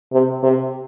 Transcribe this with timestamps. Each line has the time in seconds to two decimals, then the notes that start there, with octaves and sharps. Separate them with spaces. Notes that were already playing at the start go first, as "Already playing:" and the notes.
0.12 C3
0.43 C3